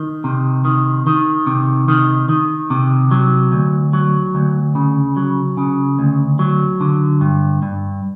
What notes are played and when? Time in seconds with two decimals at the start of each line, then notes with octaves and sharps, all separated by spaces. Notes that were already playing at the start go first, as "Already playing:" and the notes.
Already playing: D#3
0.24 C3
0.65 D#3
1.07 D#3
1.47 C3
1.88 D#3
2.29 D#3
2.70 C3
3.11 F#3
3.52 D2
3.93 F#3
4.35 D2
4.75 C#3
5.16 F#3
5.57 C#3
5.99 D2
6.39 F#3
6.81 D3
7.21 G2
7.62 G2